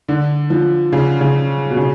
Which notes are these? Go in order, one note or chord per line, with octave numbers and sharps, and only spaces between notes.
D3
F3
C#3
C#3
B2
C#3